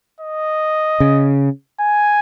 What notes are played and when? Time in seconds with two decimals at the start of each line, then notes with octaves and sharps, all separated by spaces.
0.21 D#5
1.00 C#3
1.80 G#5